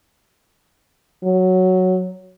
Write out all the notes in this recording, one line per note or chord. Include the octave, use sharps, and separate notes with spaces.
F#3